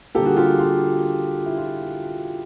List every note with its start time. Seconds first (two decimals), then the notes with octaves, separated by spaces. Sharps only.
0.15 D3 G3 A#3 G4 A4
0.26 F#4 G#4
0.36 F4 G4
0.59 F4
1.46 E4
1.57 F4